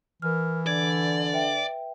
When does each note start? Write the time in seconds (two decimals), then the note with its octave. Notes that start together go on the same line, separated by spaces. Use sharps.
0.22 E3 A#4 F6
0.67 D3 D5 G#6
1.33 B4 E5 G5